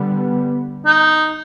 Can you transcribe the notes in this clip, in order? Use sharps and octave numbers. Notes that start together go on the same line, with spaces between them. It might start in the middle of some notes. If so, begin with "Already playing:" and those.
Already playing: D3 G3 B3
D#4